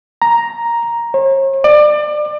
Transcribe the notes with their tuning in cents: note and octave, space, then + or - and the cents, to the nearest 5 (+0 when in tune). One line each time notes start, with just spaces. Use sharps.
A#5 +5
C#5 -40
D5 +30